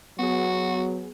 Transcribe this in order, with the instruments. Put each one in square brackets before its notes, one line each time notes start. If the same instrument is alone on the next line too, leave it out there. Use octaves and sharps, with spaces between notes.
[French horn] F#3 [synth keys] B3 G#4 [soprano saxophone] F#4